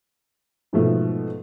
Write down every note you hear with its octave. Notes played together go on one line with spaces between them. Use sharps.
G#2 B2 F3 A3